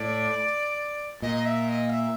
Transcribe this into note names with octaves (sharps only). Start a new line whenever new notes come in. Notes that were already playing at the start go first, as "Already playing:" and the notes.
Already playing: A2 D5
A#2 D#5
E5
D#5
F5
E5